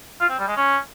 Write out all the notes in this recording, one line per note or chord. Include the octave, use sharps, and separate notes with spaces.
F4
C4
G3
G#3
C#4